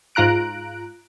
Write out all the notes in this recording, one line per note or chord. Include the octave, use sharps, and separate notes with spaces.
G#2 F4 A#5 F#6 D7